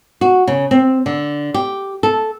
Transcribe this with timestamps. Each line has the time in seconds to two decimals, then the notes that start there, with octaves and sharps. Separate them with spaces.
0.21 F#4
0.48 C#3
0.71 C4
1.06 D3
1.54 G4
2.03 A4